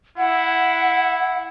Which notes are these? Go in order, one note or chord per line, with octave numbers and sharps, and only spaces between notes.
E4 F#5